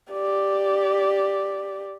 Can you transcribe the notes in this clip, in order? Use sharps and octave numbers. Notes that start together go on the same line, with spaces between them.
G4 D5